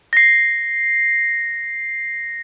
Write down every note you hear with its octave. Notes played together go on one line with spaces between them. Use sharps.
A#6 C7